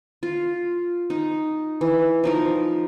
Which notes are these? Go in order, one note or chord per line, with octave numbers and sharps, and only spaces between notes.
F4
D#4
E3
F3 D#4 A#4